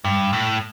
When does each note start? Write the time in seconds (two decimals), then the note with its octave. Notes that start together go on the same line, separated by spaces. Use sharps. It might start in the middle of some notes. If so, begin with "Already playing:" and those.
0.04 G2
0.33 A2